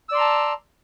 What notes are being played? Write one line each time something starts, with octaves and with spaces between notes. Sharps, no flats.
D5 A5 A#5 C6 E6